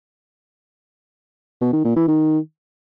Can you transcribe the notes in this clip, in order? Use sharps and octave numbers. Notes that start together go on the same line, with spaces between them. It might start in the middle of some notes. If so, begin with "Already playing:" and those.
B2
D#3
A#2
E3
D#3